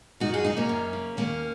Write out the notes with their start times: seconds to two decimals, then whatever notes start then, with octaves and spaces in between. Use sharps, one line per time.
0.20 F#2 D#4 F#4
0.33 F4 G#4
0.44 C#3 D#4 F#4
0.57 A#3 C#4
0.69 F#2
0.93 C#3
1.17 D#2 A#3 C#4